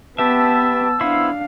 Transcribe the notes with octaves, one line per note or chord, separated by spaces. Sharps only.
B3 G4 B4 E5 A5 E6
B3 D4 E4 C5 F5